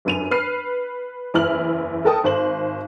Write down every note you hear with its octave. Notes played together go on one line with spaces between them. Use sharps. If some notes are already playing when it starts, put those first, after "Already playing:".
G1 F#2 D#7 F7
B4 F6 C7 D#7
F#1 E2 E4 F6 F#7
A4 A#4 G5 A5 D#6
G#1 C5 F#7